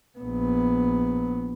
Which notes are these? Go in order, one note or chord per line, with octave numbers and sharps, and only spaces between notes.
A#1 B3